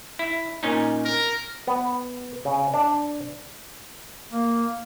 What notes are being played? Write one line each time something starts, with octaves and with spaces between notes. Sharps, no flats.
E4
A#2 C#4 D#4
A#4
B3
C#3
D4
A#3